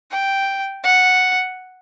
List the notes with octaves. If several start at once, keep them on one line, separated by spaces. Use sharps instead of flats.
G5
F#5